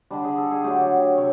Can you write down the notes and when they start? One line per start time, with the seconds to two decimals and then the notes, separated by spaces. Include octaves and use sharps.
0.11 D3 G3 D4
0.24 G#4
0.38 A4
0.51 G#4
0.64 D3 F#3 A3 G4
1.17 C3 C#5